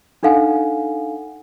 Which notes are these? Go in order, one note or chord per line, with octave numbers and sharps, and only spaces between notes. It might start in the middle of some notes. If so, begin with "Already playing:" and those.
D4 D#4 A4 F5 F#5 G#5